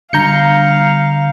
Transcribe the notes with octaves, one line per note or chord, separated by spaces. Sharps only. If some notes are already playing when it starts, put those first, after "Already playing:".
D3 G3 D4 F5 A#5 G6 C#7